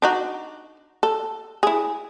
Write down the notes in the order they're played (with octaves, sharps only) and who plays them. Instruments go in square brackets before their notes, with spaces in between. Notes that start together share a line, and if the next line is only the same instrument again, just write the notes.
[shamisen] D4 D#4 F#4
A4
E4 G#4